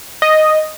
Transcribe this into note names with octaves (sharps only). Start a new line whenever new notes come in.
D#5